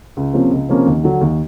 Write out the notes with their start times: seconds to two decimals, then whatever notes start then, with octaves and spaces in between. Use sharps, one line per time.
0.17 C#2
0.34 C3 F3 A#3 C#4
0.51 C#2
0.69 C3 F3 A#3 C#4
0.87 D#2
1.03 D3 F#3
1.21 D#2